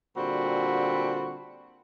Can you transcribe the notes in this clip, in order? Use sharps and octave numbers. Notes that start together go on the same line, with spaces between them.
A#2 D3 G3 C4 F#4 B5